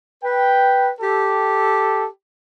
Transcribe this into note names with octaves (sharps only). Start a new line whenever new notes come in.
B4 G5
G4 A4